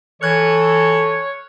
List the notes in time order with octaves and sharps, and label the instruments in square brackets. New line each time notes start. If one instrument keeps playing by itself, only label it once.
[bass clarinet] E3 [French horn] A4 [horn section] C#5 [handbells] F6 F#6 G#6